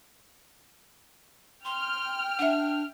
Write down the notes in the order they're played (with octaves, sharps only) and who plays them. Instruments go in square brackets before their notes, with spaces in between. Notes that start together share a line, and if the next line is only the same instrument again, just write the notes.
[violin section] G5 F6 [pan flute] C6
[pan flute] D4 [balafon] E5 F#5